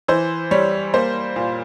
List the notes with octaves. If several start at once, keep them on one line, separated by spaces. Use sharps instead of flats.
E3 C5
G3 C#5
A#3 C5
A#2